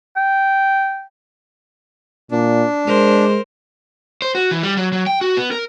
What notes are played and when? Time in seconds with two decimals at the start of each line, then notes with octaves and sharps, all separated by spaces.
0.16 G5
2.31 A#2 D4
2.87 G#3 A#4 C5
4.22 C5
4.35 F#4
4.51 E3
4.63 G3
4.77 F#3
4.92 F#3
5.07 G5
5.21 F#4
5.37 B3
5.52 A#4